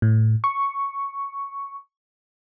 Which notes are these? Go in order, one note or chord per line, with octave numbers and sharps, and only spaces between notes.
A2
C#6